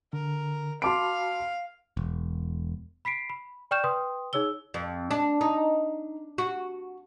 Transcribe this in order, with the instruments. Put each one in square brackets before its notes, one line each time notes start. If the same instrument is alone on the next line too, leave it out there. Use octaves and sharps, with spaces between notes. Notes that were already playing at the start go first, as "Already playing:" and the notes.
[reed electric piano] D3 [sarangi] A#4
[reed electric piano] F#4 A5 B5 [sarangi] F5 [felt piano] C6 D6 D7
[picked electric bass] E1
[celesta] B5 B6 C7 D7
B5
D5 G5 C#6 F6 G6 E7
B4 G5 C6 D#6
D#4 G#4 C#5 E6 G7
[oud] F2
D4
D#4
F#4